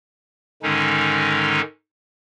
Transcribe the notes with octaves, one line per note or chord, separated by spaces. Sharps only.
G#2 D3 D#3 G#3 C#4 D#4